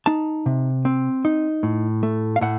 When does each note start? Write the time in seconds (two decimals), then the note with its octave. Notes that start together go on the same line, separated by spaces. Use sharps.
0.06 D#4 A5
0.46 C3
0.85 C4
1.25 D#4
1.63 A2
2.03 A3
2.36 F5
2.41 A2 F#5